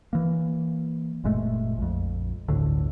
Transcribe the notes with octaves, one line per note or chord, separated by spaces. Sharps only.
E3 A#3
F#1 A#2 G#3 A3
A#1 F2
G1 D2 A2 D3